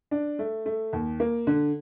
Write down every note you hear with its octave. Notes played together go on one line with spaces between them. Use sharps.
D4
A3
A3
D#2
A#3
D3